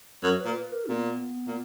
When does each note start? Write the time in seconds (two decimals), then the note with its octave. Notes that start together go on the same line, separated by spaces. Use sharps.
0.23 F#2 C#5
0.39 B4
0.45 A#2
0.57 B4
0.72 A#4
0.89 A#2 B3
1.47 A#2